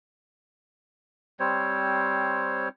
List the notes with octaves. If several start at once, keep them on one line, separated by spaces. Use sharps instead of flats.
G3 C4 C5 C#5